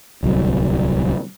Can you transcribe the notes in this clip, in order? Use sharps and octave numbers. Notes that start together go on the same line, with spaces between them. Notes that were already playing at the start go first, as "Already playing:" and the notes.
D1 C2 F#3